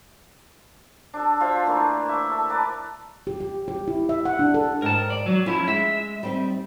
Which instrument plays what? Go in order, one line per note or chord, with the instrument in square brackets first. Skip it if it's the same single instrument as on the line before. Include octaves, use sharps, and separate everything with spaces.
[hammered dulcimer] D4 A4
F4 C5 E5
E3 A3 A#3 D4
E5 C#6 D6
A4
A#4 B4 D5 A5
[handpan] G4
G4
G4
E4
E5
F#5
D4
A4
[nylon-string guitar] G#2 D#3 [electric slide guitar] A#4 A5
[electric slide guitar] D5
F#3
[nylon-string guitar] F3 [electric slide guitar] C#4 E4
[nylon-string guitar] G#3 [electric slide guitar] E5
[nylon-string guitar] G3 C4 D#4